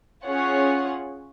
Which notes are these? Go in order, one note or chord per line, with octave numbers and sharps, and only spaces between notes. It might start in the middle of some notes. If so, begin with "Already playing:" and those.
C#4 F4 G#4 C#5 F#5